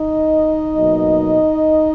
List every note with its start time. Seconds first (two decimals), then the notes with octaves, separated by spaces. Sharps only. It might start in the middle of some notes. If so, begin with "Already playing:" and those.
Already playing: D#4 D#5
0.75 B2 F#3 A#3